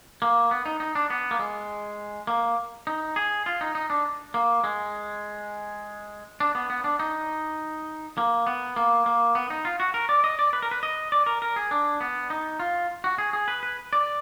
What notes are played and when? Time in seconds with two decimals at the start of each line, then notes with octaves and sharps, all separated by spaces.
0.22 A#3
0.51 B3
0.66 D#4
0.80 D#4
0.95 D4
1.10 B3
1.31 A#3
1.39 G#3
2.27 A#3
2.87 D#4
3.16 G#4
3.46 F4
3.61 D#4
3.75 D#4
3.90 D4
4.34 A#3
4.64 G#3
6.40 D4
6.55 B3
6.70 B3
6.84 D4
6.99 D#4
8.18 A#3
8.47 B3
8.76 A#3
9.06 A#3
9.35 B3
9.50 D#4
9.65 F4
9.80 F#4
9.94 A#4
10.09 D5
10.24 D#5
10.39 D5
10.53 B4
10.62 A#4
10.71 B4
10.83 D#5
11.12 D5
11.26 A#4
11.42 A#4
11.56 G#4
11.71 D4
12.01 B3
12.30 D#4
12.60 F4
13.04 F#4
13.18 G#4
13.33 G#4
13.48 B4
13.63 B4
13.93 D5